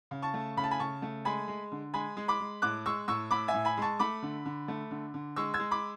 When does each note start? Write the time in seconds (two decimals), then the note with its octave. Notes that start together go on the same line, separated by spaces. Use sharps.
0.11 C#3
0.22 A5 C#6
0.34 A3
0.57 C#3 B5
0.64 A5
0.71 G#5 B5
0.79 C#3 A5 C#6
1.02 A3
1.25 G#3 G#5 B5
1.48 G#3
1.72 D3
1.94 G#3 G#5 B5
2.17 G#3
2.28 B5 D6
2.40 G#3
2.62 A2 D6 F#6
2.86 G#3 C#6 E6
3.08 A2 C#6 E6
3.31 A2 B5 D6
3.48 E5 G#5
3.54 A2
3.65 G#5 B5
3.77 G#3 A5 C#6
3.99 A3 B5 D6
4.22 D3
4.46 D3
4.68 A3
4.91 D3
5.14 D3
5.36 G#3 C#6 E6
5.54 E6 G#6
5.59 G#3
5.71 B5 D6